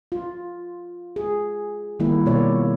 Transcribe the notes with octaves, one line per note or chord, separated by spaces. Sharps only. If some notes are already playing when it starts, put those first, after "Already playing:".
F4
G#4
D#3 G3 A#3 E4
B2 A#3 F4 C#5 D5